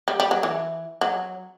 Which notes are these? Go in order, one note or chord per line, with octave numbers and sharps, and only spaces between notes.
G3
G3
F#3
E3
F#3